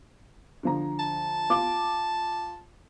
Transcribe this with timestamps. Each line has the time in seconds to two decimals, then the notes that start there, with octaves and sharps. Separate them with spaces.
0.63 D3 F3 A#5
0.99 A5
1.50 F4 D6